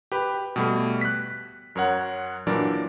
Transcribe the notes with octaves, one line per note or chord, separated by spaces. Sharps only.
G4 B4
B2 G3 A3
F#6 B6
F#2 A#4 C#5 F#5
A#2 E3 F#3 D4 A#4 D5